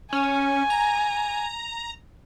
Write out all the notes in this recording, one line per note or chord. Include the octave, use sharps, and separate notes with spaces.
C#4 G#5
A#5